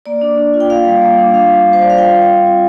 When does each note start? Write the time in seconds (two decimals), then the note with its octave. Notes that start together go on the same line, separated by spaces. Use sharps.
0.06 A#3 D5
0.21 D4
0.38 D4
0.54 F4
0.60 G5
0.69 A#3 F5
0.85 G3
1.02 A#3
1.18 D4
1.34 F4 F5
1.50 G3
1.66 G3
1.73 C5
1.81 G3 D5
1.90 F5
1.98 F4 G5
2.14 C4
2.29 C4
2.46 F4